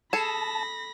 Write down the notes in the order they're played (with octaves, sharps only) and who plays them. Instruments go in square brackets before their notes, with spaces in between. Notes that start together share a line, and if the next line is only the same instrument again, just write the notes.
[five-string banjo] G#4 A4 [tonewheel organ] A5 [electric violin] B5 A#6